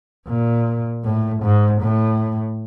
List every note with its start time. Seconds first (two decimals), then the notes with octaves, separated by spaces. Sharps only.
0.27 A#2
1.04 A2
1.43 G#2
1.81 A2